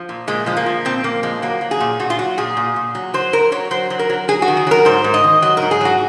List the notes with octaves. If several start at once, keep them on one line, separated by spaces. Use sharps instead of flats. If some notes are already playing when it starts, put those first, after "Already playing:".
Already playing: F3
A#2
A#2 G#3
F3 G#3
A#3
F3
A#2 C4
A#2 A#3
F3 G#3
F#3 A#3
F#3
G#4
A#2
A#2 F#4
F4
F#3 F#4
A#2 G#4
A#2
A#2
F#3
F#3 C5
F#3 A#4
F#3 C#5
F#3 C5
F#3
A#4
F#3
F#3 G#4
F#4
D#3
G#4
F#3 A#4
G#2 C5
G#2
D#5
D#3
F#3 D#5
G#2 A#4
G#4
F#3 F#4